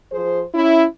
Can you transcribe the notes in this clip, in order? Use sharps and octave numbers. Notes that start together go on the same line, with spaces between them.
F3 G#4 C5
C#4 E4